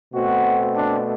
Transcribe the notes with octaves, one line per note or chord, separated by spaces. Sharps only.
B2 A3 C4 F#4
D4